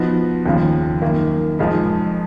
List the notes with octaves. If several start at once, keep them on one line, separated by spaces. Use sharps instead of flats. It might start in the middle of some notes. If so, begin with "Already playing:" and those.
Already playing: F3 B3 D#4 F#4
D#2 C#3 F3
F#2 D#3 A#3
F2 F3 G#3 D#4